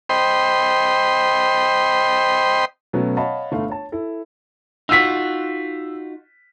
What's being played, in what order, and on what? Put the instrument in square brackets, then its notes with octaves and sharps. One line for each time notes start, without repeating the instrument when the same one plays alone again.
[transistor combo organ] C5 D#5 G5 B5 C6
[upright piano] B2 F#3 A3 B3 C#4
C#5 D#5 F5 F#5 A5 B5
G1 A3 F5
C#5 A5
E4 A4
[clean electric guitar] D#4 F4 F#4 [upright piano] E6 B6